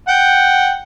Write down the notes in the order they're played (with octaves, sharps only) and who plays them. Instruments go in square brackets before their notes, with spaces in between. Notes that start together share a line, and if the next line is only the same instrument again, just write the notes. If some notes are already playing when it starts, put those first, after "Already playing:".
[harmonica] F#5 G5